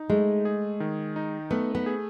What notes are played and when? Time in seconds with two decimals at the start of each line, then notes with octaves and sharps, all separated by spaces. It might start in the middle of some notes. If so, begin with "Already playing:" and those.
Already playing: D#4
0.10 G#3 A3
0.45 G#4
0.80 D#3
1.16 D#4
1.51 A3 B3
1.75 B3
1.86 G#4